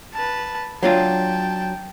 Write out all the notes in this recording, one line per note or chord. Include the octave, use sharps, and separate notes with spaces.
B4 A5
F#3 D4 F4 G5 A5